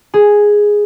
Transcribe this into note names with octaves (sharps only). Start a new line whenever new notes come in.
G#4